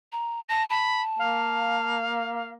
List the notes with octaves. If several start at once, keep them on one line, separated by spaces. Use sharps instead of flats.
A#5
A5 A#6
A5 B5
A#3 F5